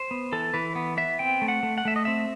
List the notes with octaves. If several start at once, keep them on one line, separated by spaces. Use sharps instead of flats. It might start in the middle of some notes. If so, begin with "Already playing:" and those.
Already playing: C5
B3
E3 A4
E3 B4
B3
B3 E5
C4 G5
A3
F#5
A3
F#5
A3 E5
D#5
C4 E5